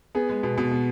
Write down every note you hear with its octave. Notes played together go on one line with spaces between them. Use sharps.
B3 G#4
G#3
B2
B2
B3